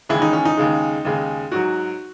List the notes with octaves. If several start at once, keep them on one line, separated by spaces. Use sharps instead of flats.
D#2 C#3 E3 G#3 E4
D#4
C#4
D#4
D#2 C#3 G#3
D#2 C#3 G#3
G#2 F#3 F#4